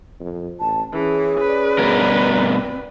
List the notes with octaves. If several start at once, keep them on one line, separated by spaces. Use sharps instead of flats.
F2
A1 A5
E3 C#4 G#4
B4 D5
G2 B2 A#4
C4